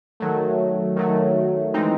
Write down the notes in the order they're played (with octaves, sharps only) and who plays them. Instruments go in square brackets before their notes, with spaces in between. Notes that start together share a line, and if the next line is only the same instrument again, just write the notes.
[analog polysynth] D#3 F#3 A3
D#3 F#3 A3
E3 G#3 C4 D#4